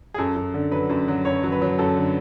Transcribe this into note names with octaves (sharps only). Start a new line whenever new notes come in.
G#4
F#2 A4
F#2
D3
F#3 B4
F#2
F#3
F#2 C#5
F#3
B4
F#3
F#2 A4
D3